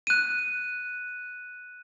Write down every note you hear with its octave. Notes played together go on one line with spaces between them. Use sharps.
F#6 D#7